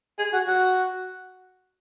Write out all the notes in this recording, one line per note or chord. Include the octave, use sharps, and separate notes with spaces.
G#4
F#4
F#4